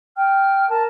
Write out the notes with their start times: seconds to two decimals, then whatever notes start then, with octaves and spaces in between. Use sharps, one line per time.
0.16 G5 F6
0.69 A#4 A5